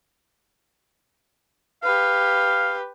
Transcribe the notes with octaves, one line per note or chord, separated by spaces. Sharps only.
G4 B4 F5